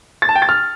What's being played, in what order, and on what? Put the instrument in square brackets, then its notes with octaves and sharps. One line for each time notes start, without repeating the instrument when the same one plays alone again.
[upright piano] A6
A5
G5
A6
F6